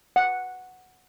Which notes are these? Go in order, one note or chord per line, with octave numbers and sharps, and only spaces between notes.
F#5